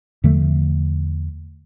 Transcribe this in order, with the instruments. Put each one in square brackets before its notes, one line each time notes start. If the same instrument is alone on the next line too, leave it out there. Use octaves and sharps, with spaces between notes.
[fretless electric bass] E2 D3 F3 A3